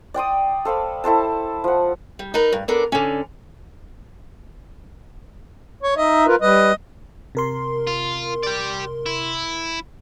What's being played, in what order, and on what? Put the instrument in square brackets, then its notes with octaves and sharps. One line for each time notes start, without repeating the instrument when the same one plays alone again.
[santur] D5 G5 C6 D#6
A4 C5 F5 B5
E4 A4 C5 A5
F3 F#5
[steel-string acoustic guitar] G3
D#4 A#4 B4
G2
B3 D4 A4 A#4 D5
D3 C#4
[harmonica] C#5
[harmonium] D#4 E5 [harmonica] D#5
[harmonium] F4 A#4 B4
[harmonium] G3 B4 [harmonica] D#5
[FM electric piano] C3 A#4 C6
[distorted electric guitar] F4
G4 D5
E4